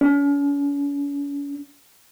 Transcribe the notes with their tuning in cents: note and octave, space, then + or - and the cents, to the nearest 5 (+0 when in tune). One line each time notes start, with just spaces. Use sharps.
C#4 +40